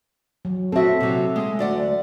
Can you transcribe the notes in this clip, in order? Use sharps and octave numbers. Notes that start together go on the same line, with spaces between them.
F#3
C4 F#4 A4 E5
C3 F#3
G#3
D2 D5 F#5